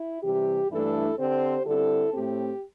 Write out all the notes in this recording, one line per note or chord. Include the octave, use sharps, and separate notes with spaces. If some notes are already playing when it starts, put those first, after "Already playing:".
Already playing: E4
C3 E3 G3 G4
G2 E3 A3 D4 E4 A4
D3 C4 G4 C5
D3 G3 C4 E4 A4
A2 A3 C4 G4